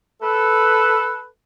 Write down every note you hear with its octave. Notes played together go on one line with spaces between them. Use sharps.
A4 B4